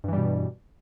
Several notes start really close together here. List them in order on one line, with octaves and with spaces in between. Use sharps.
G2 E3 G3 B2